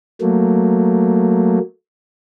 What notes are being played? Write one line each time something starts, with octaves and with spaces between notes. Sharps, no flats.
F#3 A3 A#3